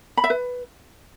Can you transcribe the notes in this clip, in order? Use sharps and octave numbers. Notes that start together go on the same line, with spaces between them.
B5
E5
B4